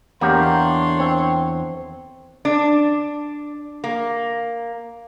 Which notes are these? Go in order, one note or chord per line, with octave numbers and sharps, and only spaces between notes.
E2 A#3 D4 G4 A#4 C#5 C6
C4
D4
A#3